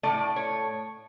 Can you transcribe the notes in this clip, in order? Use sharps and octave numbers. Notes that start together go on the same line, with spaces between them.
A2 F#3 A3 D5
C#5